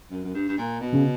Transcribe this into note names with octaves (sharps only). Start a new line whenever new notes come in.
F#2
F#2
G2
G2
A#2
B2
C#3